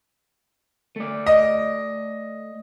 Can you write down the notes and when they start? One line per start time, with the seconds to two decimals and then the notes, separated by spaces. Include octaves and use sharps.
0.96 A3 D5
1.26 D#5